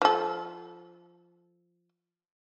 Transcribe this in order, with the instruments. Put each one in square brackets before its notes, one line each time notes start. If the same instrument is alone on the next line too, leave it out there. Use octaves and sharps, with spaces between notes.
[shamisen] F3 A4